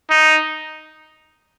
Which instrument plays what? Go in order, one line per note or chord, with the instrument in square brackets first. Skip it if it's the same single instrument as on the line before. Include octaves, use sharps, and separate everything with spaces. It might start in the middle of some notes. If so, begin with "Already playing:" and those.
[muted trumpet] D#4